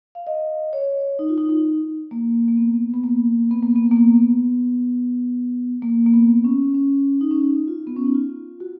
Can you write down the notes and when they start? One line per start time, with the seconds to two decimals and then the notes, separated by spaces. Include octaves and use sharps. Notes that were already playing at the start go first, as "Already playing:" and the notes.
0.15 F5
0.27 D#5
0.73 C#5
1.19 D#4
1.29 F4
1.38 D#4
1.49 D#4
2.11 A#3
2.48 A#3
2.57 B3
2.94 B3
3.04 A#3
3.51 B3
3.63 A#3
3.76 B3
3.91 A#3
3.97 B3
5.82 A#3
6.06 A#3
6.14 B3
6.44 C#4
6.74 C#4
7.21 D#4
7.31 C#4
7.41 D#4
7.68 F4
7.87 B3
7.96 C#4
8.05 D#4
8.14 F4
8.60 F#4